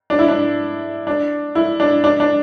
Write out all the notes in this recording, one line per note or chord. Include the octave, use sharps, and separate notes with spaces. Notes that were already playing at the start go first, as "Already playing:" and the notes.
D4
E4
D4
D4
E4
D4
D4
D4